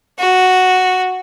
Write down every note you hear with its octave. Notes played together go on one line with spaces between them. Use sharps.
F#4